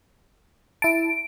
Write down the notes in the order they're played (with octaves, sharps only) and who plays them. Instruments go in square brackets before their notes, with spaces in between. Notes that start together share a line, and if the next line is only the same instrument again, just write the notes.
[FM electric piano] E4 A5 [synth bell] D7